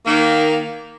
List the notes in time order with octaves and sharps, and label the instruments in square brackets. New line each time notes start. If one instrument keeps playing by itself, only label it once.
[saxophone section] D#3 A#3